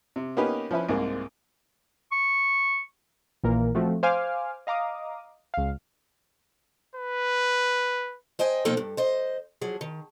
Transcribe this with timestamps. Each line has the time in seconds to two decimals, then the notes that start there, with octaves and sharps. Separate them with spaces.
0.16 C3
0.37 A#3 B3 C#4 D#4 G4 B4
0.71 F3 C#4 E4 B4
0.89 C2 G#2 G#3 A#3
2.12 C#6
3.44 A#1 A#2 E3 A#3 A#4
3.75 F3 A3 C4 F#4
4.03 C5 F5 G#5 D6 F6
4.67 D#5 F5 A#5 D6 D#6
5.54 C#2 F5
6.96 B4
8.39 C5 D#5 G5 G#5
8.65 B2 F3 A#3 D#4 A4 G5
8.77 G2
8.97 C5 D#5
9.61 F3 F#3 G#4
9.81 D#3